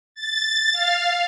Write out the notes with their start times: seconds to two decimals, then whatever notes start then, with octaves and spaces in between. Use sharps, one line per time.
0.14 A6
0.72 F5